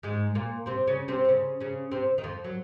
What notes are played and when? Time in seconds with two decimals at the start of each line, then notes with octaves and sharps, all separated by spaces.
0.03 G#2 G#3
0.35 A#2 A#3
0.66 C3 C4
0.87 C#3 C#4
1.08 C3 C4
1.25 C4
1.29 C#3 C#4
1.60 C#3 C#4
1.91 C3 C4
2.18 D#3
2.24 F2 F3
2.44 F#3